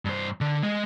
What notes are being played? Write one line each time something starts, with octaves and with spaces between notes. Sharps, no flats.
G2 C5
D3
G#3 D#5